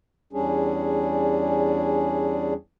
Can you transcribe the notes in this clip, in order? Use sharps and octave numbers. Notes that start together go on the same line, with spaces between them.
E2 G3 C#4 D4 G#4